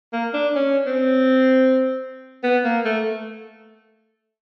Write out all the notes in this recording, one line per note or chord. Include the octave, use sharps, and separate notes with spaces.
A#3
D4
C#4
C4
B3
A#3
A3